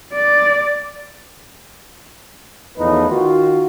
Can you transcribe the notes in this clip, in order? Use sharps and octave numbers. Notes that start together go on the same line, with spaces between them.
D5
E2 A2 F3 D#4 B4
D#3 F4 F#4